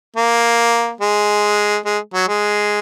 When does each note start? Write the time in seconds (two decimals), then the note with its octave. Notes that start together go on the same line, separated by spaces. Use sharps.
0.16 A#3
1.01 G#3
1.85 G#3
2.14 F#3
2.28 G#3